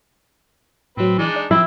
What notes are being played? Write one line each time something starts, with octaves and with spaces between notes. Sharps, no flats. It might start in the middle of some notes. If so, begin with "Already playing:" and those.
A2 F#3 C4 B4
E3 G#3 D4 D#4
D5
F3 C4 E4